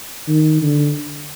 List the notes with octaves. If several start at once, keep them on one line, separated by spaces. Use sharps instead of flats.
D#3
D3